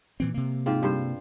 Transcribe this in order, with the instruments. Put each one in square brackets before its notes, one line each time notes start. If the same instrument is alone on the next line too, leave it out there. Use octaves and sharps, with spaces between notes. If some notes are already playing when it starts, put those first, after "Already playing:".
[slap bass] A#2 E3 C4
C3 A#3
[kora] G#2 C4 F4
G2 C5